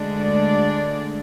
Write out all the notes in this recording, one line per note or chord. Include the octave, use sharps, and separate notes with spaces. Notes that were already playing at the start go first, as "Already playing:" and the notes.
Already playing: D2 D3 G#3 D4
D5